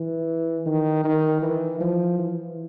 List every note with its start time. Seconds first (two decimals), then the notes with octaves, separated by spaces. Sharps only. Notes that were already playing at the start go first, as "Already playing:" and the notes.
Already playing: E3
0.66 D#3
1.04 D#3
1.42 E3
1.80 F3
2.18 E3